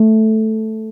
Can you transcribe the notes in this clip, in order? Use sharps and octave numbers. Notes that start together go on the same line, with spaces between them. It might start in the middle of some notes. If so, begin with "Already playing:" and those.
Already playing: A3